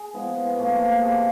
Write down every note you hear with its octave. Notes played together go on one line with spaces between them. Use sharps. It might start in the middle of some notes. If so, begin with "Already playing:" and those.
Already playing: G#4
F3 G#3 B3 E4
A#2 F3 A3
C3 F3 A3 C4 G#4